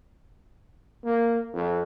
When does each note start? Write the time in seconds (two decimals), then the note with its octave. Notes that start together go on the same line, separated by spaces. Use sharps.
1.04 A#3
1.53 F2